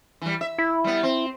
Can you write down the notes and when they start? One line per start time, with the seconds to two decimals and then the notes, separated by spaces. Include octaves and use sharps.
0.22 E3 G3
0.41 E5
0.58 E4
0.84 G3 B3
1.03 C4